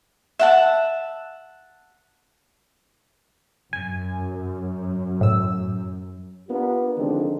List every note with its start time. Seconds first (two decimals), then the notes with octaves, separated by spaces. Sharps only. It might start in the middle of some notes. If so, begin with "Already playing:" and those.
0.39 E5 F#5 A5
3.73 F#2 G#5
5.21 A2 E6
6.48 B3 D4 F4 G4 A#4
6.97 D3 D#3 F3 G#3 C4 D4